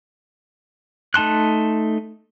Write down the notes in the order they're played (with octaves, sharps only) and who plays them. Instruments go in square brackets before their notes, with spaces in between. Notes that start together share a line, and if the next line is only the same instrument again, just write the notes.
[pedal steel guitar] A3 D#4 A5 C6 F#6